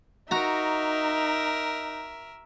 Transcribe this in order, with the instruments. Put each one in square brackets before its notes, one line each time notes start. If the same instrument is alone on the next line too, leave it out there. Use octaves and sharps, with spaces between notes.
[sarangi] D#4 [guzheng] F#4 A#5 [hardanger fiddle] A#4 E5